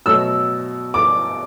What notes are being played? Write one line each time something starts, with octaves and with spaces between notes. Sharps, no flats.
B2 F#3 A3 E6
D6